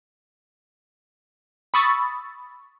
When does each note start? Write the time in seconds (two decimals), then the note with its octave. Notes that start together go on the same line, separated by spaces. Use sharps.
1.74 B5 C#6 D#6 E6 A6